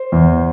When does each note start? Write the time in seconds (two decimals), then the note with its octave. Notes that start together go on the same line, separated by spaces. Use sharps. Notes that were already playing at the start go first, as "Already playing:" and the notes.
Already playing: C5
0.12 E2